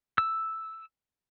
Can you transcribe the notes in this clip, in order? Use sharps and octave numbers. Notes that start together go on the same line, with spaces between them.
E6